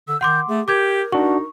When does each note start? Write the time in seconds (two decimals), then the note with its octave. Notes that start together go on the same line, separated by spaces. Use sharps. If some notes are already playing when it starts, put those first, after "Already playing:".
0.08 D3 E6
0.21 D#3 F#5 C6 D6 G6
0.48 A3 G#4
0.68 G4 A#4 D6 G6 G#6
1.12 D4 D#4 F#4 C#6